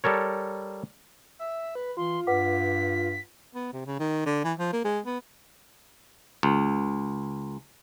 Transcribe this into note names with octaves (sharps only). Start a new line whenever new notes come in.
G3 A4 A#4 C#5
E5
B4
E3 F4 C6
G2 B4 F#5 D6 B6
B3
C3
C#3
D#3
D3
E3
F3
A#3
G#3
B3
C#2